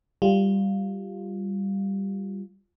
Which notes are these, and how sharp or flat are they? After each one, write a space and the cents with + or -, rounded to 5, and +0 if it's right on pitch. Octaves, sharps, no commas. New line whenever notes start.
G3 +0 F4 +0